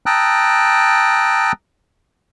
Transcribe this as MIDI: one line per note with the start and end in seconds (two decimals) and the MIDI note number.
0.06 1.52 79
0.06 1.52 81
0.06 1.52 82
0.06 1.52 87
0.06 1.52 88
0.06 1.52 90